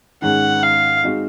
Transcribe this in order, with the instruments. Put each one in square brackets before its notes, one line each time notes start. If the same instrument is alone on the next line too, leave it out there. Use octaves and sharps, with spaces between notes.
[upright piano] G#2 D#3 G#3 C#4 [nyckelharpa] F#5
[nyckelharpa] F5
[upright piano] G#3 C4 D#4 F#4